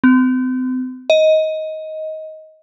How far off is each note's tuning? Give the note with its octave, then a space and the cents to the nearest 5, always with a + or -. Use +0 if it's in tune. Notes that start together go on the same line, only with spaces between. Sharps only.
C4 -40
D#5 +15